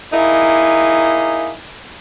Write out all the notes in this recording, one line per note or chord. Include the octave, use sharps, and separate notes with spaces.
A#3 D#4 E4 G#4